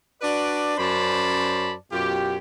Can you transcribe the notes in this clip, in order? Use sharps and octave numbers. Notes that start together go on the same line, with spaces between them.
D4 F#4 B4 D5
F#2 C#4 C5 D5 A5 B5
F#2 B2 F4 G4